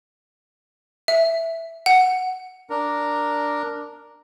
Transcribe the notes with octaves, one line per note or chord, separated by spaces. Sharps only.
E5
F#5
D4 A#4